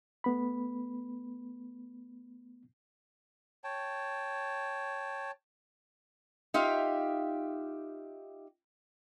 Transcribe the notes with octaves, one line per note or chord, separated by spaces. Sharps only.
A3 B3 B5
C#5 G5 A5
D#4 F4 G4 E5 F5